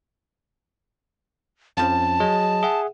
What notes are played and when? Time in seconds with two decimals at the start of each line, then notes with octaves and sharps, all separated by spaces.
1.77 F2 F3 C#4 A5
2.20 F#3 G#4 D#5
2.63 G#4 E5 F#5